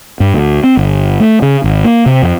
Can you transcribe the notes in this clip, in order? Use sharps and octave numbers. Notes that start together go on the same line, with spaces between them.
G2
D2
C4
G1
A3
C#3
G#1
A#3
C3
F2